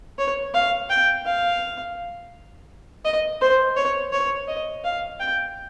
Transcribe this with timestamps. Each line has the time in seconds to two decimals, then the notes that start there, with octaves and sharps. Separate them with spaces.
0.19 C#5
0.54 F5
0.90 G5
1.26 F5
3.05 D#5
3.41 C5
3.76 C#5
4.12 C#5
4.48 D#5
4.84 F5
5.20 G5